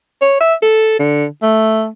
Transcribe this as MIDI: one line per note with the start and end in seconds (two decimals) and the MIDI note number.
0.22 0.39 73
0.40 0.54 76
0.62 0.94 69
0.99 1.25 50
1.43 1.88 57